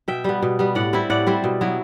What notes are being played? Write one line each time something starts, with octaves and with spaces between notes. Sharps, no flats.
B2 E5 G5
G3 B3
B2
G3 B3
A2 D5 F#5
G3 C4 E4
A2 D5 F#5
G3 C4 E4
B2
F#3 B3 E4